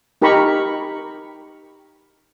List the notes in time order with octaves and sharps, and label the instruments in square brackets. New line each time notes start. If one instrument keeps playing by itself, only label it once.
[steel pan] D#4 G4 A#4 A#5 B5 C#6